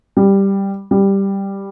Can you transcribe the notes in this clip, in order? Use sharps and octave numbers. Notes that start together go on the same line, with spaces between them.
G3
G3